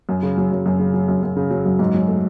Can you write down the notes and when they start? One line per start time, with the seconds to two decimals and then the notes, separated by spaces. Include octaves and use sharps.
0.09 F#2
0.23 C#3
0.37 F#3
0.52 F#2
0.66 F#2
0.79 C#3
0.94 F#3
1.08 F#2
1.23 F#2
1.37 C#3
1.51 F#3
1.65 F#2
1.79 G#2
1.94 F#3
2.08 A3